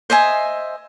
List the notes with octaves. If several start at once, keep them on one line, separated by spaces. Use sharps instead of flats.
C5 D#5 E5 G#5